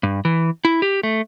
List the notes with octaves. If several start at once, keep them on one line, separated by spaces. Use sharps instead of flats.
G2
E3
E4
G4
A3